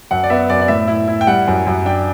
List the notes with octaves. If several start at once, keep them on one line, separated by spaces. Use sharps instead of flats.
F#2 F#5
D5
B3 E5
F#2 D5
D5
A2 E5
E4
E4
G5
G3 F#5
F#2
F#2
D4 G5